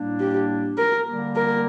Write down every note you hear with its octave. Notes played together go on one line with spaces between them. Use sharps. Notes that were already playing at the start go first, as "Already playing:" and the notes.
Already playing: A2 G3 A#3 D4
G4
A#4
D3 G3 A#3
A#4